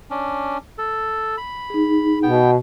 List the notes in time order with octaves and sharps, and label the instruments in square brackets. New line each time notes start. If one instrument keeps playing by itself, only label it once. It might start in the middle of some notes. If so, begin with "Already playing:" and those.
[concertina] C#4 D4
A4
B5
[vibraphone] D#4 G#4
[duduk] B2 [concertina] B3 G5